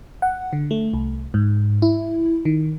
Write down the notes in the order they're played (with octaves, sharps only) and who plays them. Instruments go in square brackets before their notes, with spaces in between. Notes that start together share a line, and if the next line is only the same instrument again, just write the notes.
[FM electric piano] F#5
D3
A3
C2
G#2
E4
D#3